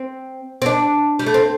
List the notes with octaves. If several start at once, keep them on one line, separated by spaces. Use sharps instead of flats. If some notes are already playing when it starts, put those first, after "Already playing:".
Already playing: C4
C4
D4
G3
A3
C4